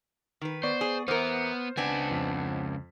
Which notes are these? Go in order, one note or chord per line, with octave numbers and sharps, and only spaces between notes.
D#3 B4
B3 C5 D5 C#6
G#4
E2 B3 A#4 C5 F6
C#2 B3 C4 D4 G#5
F2 B6